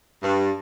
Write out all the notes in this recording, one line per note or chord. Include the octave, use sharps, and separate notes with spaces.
G2